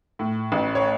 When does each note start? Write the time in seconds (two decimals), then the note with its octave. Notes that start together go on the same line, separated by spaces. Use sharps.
0.19 A2
0.52 A1
0.75 C#5